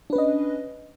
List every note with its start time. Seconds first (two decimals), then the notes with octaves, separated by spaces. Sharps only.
0.10 D4
0.13 B4
0.16 C#4
0.18 D#5